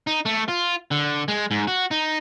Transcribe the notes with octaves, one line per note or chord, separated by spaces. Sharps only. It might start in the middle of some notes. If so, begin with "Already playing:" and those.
D#4
A3
F4
D3
G#3
G#2
F#4
D#4